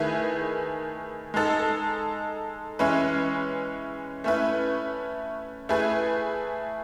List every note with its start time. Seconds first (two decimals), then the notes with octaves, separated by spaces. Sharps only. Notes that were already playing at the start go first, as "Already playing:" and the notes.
Already playing: D#3 A3 E4 G#4 B4
1.34 G#3 D#4 A4
2.79 E3 G#3 C#4 E4 B4
4.24 A3 C#4 E4 B4
5.69 A3 E4 G#4 B4